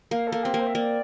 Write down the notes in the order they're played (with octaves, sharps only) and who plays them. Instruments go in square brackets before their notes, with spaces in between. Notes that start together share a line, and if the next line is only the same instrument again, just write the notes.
[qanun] A#3 [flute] F5
[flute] A4
[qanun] A#3
[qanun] C4 [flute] G4
[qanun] A#3
[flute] C5
E5
[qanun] A#3 [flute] D5